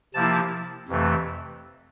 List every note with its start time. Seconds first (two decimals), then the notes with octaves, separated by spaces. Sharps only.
0.14 C3 F3 A#3 E4 A5
0.89 F2 C3 E3 A3